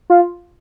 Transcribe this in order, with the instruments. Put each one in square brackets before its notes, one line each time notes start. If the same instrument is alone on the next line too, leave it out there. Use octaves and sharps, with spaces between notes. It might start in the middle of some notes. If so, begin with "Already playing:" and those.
[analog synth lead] F4